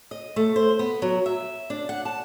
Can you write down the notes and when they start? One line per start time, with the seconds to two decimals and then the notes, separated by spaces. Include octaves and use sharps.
0.11 D#5
0.36 A3
0.56 C5
0.79 B3
1.02 F#3
1.26 E5
1.70 D4
1.89 F#5
2.05 A5